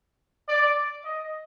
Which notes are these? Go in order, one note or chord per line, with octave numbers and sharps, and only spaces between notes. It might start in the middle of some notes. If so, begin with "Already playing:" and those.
D5
D#5